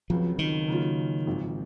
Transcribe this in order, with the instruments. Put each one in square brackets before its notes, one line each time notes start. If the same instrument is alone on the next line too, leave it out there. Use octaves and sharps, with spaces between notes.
[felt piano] C#2 C#3 F#3 C4 [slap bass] F3
[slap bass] D#3
[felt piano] C#3 F#3 A#3 C#4 F4
G#1 G#2 F3 C4